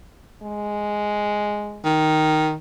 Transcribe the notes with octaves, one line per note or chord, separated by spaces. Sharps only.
G#3
D#3